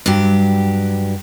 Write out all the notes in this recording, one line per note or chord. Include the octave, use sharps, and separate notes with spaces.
G2 F#3 G4